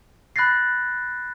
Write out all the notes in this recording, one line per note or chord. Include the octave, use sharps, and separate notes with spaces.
B5 F#6 G6 A6 A#6 C7